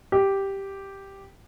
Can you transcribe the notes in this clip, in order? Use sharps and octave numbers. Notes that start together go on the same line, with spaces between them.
G4